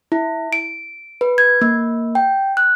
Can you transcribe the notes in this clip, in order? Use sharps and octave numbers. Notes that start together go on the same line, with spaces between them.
E4
D7
B4
G#6
A#3
G5
F#6